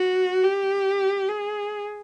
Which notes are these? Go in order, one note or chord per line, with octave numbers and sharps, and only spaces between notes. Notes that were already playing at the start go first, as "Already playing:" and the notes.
Already playing: F#4
G4
G#4